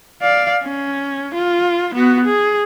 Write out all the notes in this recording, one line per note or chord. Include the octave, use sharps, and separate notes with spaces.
D5 F5
C#4
F4
B3 F#4
G#4